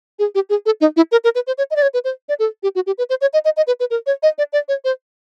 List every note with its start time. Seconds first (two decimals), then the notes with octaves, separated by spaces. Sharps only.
0.19 G#4
0.35 G4
0.50 G#4
0.66 A4
0.81 D#4
0.97 E4
1.12 A#4
1.24 A#4
1.35 B4
1.47 C5
1.58 C#5
1.71 D#5
1.76 D5
1.82 C#5
1.94 B4
2.04 C5
2.29 D5
2.39 A4
2.63 G4
2.75 F#4
2.87 G4
2.98 B4
3.10 C5
3.21 C#5
3.33 D#5
3.45 D#5
3.57 D#5
3.67 B4
3.80 B4
3.90 A#4
4.06 C#5
4.23 D#5
4.38 D5
4.53 D5
4.68 C#5
4.84 C5